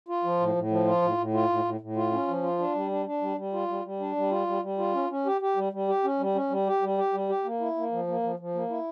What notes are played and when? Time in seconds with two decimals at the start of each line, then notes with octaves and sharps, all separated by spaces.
0.08 F4
0.24 F3
0.40 A2
0.55 A2
0.70 F3
0.86 F4
1.02 A2
1.17 A2
1.34 F4
1.49 A2
1.65 A2
1.81 A2
1.96 F4
2.12 C#4
2.28 F3
2.43 F4
2.59 D4
2.75 G3
2.91 D4
3.06 D4
3.21 G3
3.37 G3
3.53 F4
3.68 G3
3.85 G3
4.00 D4
4.16 G3
4.31 F4
4.47 G3
4.62 G3
4.78 F4
4.94 C#4
5.10 C#4
5.26 G4
5.41 G4
5.56 G3
5.73 G3
5.88 G4
6.04 C#4
6.19 G3
6.35 C#4
6.50 G3
6.67 G4
6.82 G3
6.98 G4
7.13 G3
7.29 G4
7.44 A#3
7.60 E4
7.76 A#3
7.92 F3
8.07 A#3
8.23 F3
8.39 F3
8.55 A#3
8.70 E4